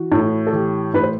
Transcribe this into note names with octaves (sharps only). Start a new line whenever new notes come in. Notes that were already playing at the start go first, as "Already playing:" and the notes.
Already playing: E3 F#4
A2
A4
E3 G4
A2 B4
C5